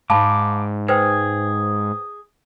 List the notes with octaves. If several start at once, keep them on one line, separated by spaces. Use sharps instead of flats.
G#2 F5 A5 B5 D6
G#4 B4 C5 G5